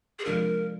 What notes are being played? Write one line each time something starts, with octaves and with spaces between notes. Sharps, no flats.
G#4
C3 F3 G#3 D4 F4 A#4